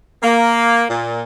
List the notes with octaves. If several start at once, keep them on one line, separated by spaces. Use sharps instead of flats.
A#3
A#2